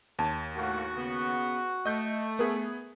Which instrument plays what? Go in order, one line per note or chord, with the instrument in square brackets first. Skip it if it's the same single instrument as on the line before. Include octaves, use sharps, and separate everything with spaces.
[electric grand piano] D#2 [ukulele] C#5 A5
[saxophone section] A2 A3 A#3 [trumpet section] F#4
[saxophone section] C#3 B3
[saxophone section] A3 [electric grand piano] D#5 G6
[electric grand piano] B3 G#4 [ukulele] A#4 E5